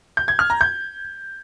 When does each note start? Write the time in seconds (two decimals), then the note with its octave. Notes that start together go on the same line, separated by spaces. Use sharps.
0.17 G6
0.28 G#6
0.39 F6
0.50 A#5
0.61 G6